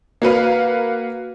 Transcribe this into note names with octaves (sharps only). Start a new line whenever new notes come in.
A#3 F#4 B4 F5